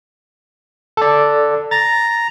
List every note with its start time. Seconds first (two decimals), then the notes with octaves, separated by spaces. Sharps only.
0.97 A4 D5
1.71 A#5 A6